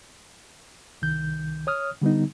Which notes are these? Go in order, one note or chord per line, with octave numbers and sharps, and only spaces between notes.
C2 D#3 G6
C#5 D#6 F6
D3 G3 B3 D#4